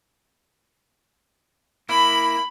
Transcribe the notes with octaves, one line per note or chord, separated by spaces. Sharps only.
A#3 E4 B5